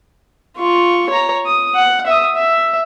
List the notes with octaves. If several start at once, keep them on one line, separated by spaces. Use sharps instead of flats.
F4 C#6
C#5 A#5
D#6
F#5
E5 D#6
E5